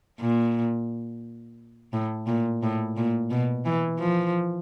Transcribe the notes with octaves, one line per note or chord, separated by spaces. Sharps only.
A#2
A2
A#2
A2
A#2
B2
E3
F3